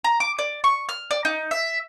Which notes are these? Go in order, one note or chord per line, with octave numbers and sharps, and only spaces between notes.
A#5
D6
D5
C#6
F6
D5
D#4
E5